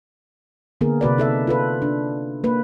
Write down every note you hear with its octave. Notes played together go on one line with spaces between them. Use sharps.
D3 A#3 B3 G#4 A#4
C3 F#4 B4 D5
D#4 A4 E5
F4 A4 B4
D4
A#3 B4